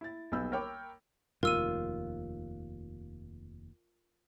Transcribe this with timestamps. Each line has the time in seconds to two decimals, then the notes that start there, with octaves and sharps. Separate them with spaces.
0.01 E4 A6
0.32 D#1 B1 B3 B5 E6 G6
0.52 A#4 C#5 G5 B5 D6
1.43 F1 D#2 F4 A#4 E6 D#7